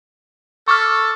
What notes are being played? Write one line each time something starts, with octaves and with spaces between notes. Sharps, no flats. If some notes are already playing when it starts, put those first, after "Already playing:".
A4 C#6 D6 F6